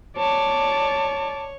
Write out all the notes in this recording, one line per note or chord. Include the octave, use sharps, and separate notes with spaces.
C#5 D5 A5